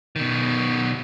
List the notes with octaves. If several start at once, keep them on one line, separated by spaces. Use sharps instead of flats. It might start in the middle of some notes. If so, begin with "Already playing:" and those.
B2 D#3